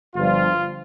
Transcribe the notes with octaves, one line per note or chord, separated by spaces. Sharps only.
G1 G2 F3 F4